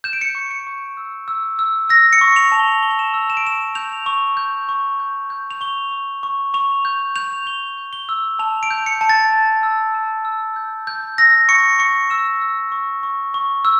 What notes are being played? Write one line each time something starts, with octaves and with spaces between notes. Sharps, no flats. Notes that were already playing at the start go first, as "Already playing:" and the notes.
G6 E7
D7
C#7
D7
C#6
C#7
C#6
E6
E6
E6
E6 A#6
C#7
C#6
F7
A5
G7
C#6 G7
F7
E7
F7
E6
E7
D7
C#6 E7
G6 F7
C#6
G6
C#6
G6
G6
F7
C#6 G7
C#6
C#6
C#6 F7
G6
G6 F7
G6 G7
G6
G7
E6
A5 F7
D7
G6
C#7
A5
A6
A5
E6
A5
E6
G6
G6
E6 A#6
C#6 C#7
C#6 C#7
E6 E7
E6
C#6
C#6
C#6
E6